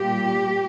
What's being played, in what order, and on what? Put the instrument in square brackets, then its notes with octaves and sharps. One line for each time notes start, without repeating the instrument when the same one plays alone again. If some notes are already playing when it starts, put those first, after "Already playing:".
Already playing: [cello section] A#2 G3 A#3 G4